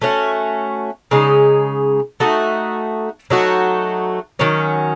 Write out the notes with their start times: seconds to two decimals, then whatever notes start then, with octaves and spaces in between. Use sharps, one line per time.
0.02 A3 C#4 F#4
1.11 C#3 G#3 D#4
2.20 A3 D#4 F#4
3.30 F#3 A3 D#4 F#4
4.39 D#3 F#3 C#4